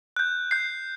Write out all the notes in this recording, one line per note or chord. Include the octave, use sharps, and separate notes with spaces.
F#6 G6
G6 C7